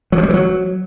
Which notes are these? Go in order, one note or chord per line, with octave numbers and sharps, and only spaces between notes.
F#3
F3
G3
E3
F#3